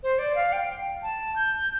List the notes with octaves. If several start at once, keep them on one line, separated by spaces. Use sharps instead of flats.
C5
D5
F5
G5
A5
G6